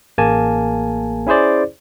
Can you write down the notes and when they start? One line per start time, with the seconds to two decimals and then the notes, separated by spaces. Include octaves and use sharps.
0.18 A1 A#3 G#4 G#5 A5
1.27 C#4 E4 G#4 C5 D5